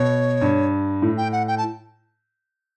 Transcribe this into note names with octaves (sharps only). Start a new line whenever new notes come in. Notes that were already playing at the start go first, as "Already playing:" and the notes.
Already playing: B2 C#5
G2
A2
G5
F#5
G5
A5